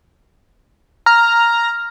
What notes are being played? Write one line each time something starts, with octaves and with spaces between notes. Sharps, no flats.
A#5 F6